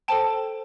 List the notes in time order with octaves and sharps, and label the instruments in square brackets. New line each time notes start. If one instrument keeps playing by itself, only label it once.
[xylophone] A4 C5 G5 A5